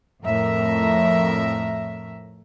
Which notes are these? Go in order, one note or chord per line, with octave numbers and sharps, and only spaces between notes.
F2 A2 A#4 E5